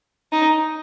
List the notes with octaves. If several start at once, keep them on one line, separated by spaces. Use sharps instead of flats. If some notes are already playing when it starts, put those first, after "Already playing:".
D#4